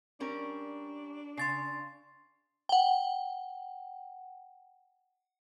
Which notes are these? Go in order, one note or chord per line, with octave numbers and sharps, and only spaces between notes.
G3 C#4 D4 A#4
C#3 C6 A6 C7
F#5 G5